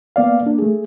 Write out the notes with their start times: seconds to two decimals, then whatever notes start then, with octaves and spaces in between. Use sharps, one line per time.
0.16 A#3 B3 D5 F5
0.43 A#3 D4
0.59 A3 G#4